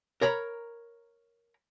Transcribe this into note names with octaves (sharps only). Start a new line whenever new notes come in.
A#4 C#5 A#5 B5